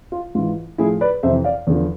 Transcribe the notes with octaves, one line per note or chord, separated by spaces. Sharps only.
F4
G#2 E3 F4
A2 F3 E4 G#4
B4 D5
F2 C3 E3 C5 E5
D5 F5
E2 D3 F3